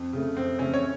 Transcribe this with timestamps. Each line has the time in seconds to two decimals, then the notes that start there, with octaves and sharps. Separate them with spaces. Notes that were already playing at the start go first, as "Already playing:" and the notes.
Already playing: F2
0.13 C#3 A3
0.36 F2 C4
0.59 C#3 A3 C#4
0.74 C#5